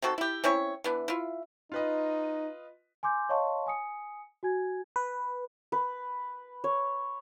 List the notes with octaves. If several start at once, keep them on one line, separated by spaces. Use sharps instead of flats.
D#3 C4 F#4 A4
E4 G4
C4 C#4 E4 C#5
E3 B3 D4
E4 F4
D#4 F4 B4 D#5
G#5 C6 D6 G6
C#5 D#5 F5 A5 C6 C#6
G#5 D#6 C#7
F#4 G#5 G#6
B4
B4
C#5